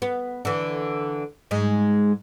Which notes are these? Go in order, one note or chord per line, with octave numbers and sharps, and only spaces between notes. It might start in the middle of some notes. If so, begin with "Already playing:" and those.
B3
D3 E3
G#2 G#3